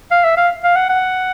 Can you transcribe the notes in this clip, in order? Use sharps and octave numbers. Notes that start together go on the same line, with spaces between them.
F5
E5
F5
F5
F#5
F#5